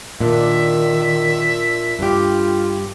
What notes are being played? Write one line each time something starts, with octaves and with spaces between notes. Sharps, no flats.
A#2 D#3 D4 E5
G2 F4 G4